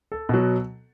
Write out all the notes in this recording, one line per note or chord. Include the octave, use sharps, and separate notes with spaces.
A4
B2 F#3